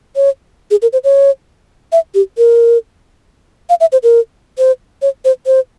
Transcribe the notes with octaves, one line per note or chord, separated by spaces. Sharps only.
C#5
G#4
A#4
C5
C#5
E5
G4
A#4
F5
E5
C5
A#4
C5
C#5
C5
C5